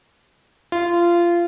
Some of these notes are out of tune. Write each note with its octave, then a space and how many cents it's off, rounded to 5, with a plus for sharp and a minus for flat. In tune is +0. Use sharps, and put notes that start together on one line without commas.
F4 -20